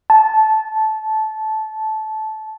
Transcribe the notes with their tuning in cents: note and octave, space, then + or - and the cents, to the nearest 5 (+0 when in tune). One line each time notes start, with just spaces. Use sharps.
A5 -15